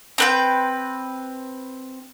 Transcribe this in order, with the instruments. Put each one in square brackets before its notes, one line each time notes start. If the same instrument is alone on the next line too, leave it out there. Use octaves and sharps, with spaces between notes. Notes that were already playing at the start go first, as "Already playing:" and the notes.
[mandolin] C4 B4 G5